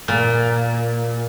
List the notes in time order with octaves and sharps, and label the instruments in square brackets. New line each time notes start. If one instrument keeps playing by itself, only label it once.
[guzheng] A#2